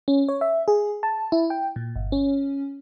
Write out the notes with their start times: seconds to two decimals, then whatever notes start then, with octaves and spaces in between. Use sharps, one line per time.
0.08 C#4
0.29 C#5
0.41 E5
0.68 G#4
1.03 A5
1.32 E4
1.50 G5
1.76 A#2
1.96 G1
2.12 C#4